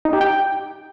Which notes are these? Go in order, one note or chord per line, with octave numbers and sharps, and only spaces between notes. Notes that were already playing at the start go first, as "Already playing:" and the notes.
D#4
G4
G5